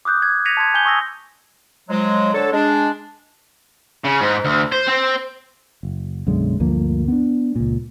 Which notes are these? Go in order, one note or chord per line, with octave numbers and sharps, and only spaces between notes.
D6 D#6 F#6 G6
G#6
G#6 A#6 B6 C#7 D#7 F7
A5 C6 G#6
G#5 G6 G7
C#6 D#6 E6 A#6
F3 F#3 G#3
D3 A4 C#5
G#3 D4
C#3
G#2
D2
C5
C4
F#1
B1 F#2 D3 G#3
D2 G2 F3 A#3
B3 D4
C#2 A#2